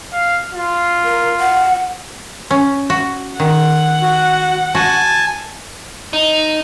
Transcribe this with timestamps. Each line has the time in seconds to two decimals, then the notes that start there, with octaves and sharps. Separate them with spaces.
0.13 F5
0.53 F4
1.04 A#4
1.40 F#5
2.51 C#4
2.90 F#4
3.40 D#3 F#5
4.02 F#4
4.75 F#4 G#5 A5
6.13 D#4